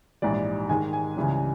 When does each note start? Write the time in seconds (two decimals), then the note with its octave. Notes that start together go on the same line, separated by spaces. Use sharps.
0.22 A#1 G#2 E3 G3 D5
0.69 G#2 D#3 G#3 G#5
0.93 G#5
1.17 C#2 C#3 E3 G3